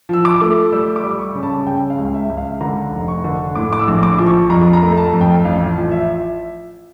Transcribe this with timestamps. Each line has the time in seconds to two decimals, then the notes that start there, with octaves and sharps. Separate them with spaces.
0.09 F3 E6
0.25 D6
0.41 A3
0.72 G3 E6
0.96 D6
1.04 G3
1.19 C#6
1.35 C#3
1.43 A5
1.67 C#3 G5
1.90 F5
1.98 C#2
2.14 E5
2.29 C#2
2.37 F5
2.61 D3 A#5
2.92 F1
3.08 C#6
3.24 D3
3.55 A2 D6
3.73 D6
3.79 E6
3.87 A#1
4.03 D6
4.19 F3
4.26 C#6
4.49 F2 A#5
4.73 A#5
4.82 A3
4.97 A5
5.13 F2
5.21 G5
5.45 A1 F5
5.76 F3
5.91 E5